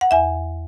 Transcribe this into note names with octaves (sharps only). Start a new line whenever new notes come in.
F#5
E2 E5 G#5